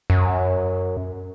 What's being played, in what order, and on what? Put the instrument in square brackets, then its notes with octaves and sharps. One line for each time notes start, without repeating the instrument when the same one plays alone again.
[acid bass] F#2